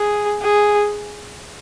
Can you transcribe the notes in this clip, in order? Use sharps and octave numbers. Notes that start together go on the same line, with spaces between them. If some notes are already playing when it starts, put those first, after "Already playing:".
Already playing: G#4
G#4